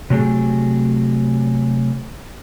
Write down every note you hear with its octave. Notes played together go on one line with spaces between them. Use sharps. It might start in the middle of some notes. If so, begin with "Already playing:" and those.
C3 F#3 A3 G4 G#4